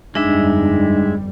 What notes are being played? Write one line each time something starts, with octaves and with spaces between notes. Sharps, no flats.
G1 F2 G3 G#3 D4 D#4 E5